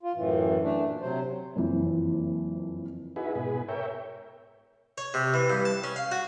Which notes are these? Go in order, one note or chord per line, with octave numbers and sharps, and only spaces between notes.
F4
F#2 A2 E3
A3 D4
A#2
C3 F#3 C5
F#1 F2 E3
D#4 E4 F#4 G#4 B4
G#2 B2 G#4 B4
A#4 C#5 E5 G5
C#5
C3
E3
G2
A5
C#4
F5
F#4